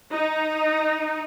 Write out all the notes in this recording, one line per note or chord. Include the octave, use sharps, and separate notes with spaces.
D#4